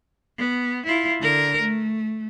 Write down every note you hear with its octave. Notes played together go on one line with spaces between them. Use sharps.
B3
E4 F4
D3 A#4
A3